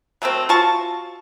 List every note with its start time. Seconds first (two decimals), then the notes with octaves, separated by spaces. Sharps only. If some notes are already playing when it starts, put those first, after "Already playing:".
0.22 F#3 A3 A#3 C4
0.49 F4 F#4 A5 C#6